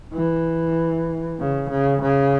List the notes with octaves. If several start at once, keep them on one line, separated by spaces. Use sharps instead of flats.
E3
C#3
C#3
C#3